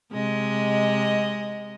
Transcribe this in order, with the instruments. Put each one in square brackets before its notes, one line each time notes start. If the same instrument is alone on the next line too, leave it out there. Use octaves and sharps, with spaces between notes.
[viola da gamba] C3 G#3 D#5